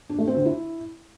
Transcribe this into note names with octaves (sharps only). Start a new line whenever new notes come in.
D4
A3
C4
D3
E4